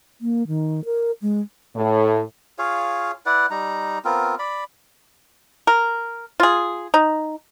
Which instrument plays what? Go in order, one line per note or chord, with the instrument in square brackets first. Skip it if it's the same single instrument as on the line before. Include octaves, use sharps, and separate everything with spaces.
[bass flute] A#3
D#3
A#4
G#3
[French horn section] A2
[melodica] F4 G#4 C#5 F5
E4 B4 D5 F#5
G3 D#4 A#5
B3 C4 F4 A#4
D5 B5
[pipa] A#4
F4 G#4
D#4